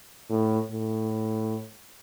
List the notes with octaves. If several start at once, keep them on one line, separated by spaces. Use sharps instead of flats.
A2
A2